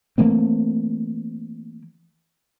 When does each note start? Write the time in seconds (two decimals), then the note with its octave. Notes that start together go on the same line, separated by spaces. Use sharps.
0.18 E3 A3 A#3 C4